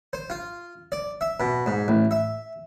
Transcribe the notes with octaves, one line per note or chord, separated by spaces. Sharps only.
C5
F4
D5
E5
B2
G#2
A1
E5